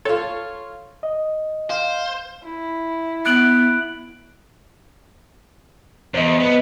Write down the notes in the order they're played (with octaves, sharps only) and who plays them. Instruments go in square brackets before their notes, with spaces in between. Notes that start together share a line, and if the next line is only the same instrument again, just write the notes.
[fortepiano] F4 C#5 [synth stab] A4
[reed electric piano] D#5
[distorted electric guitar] C5 [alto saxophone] F5
[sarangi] E4
[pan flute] B3 [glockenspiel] F#6 D7 F#7
[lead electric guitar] E2 [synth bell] C5 D#5
[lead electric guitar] B3